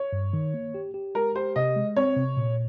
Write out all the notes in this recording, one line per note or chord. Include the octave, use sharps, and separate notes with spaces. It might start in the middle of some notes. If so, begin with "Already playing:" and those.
Already playing: C#5
G2
D#3
A#3
G4
G4
G#3 A#4
G4 C5
C3 D#5
G#3
C4 C#5
C3
A#2